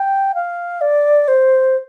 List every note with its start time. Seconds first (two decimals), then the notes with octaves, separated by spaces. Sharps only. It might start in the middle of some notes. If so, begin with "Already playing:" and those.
Already playing: G5
0.35 F5
0.81 D5
1.28 C5